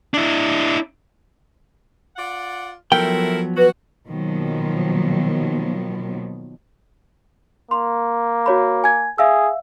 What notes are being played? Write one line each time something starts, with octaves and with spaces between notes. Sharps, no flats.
D4 E4
F4 D5 F#5
F3 F#3 A3 B3 E4 A#4 G5
F#4 B4
B2 D#3 F3 F#3 A#3 B3
A#3 C6
F#4 C#5 B5
G#5 G#6
G#4 E5 F5 E6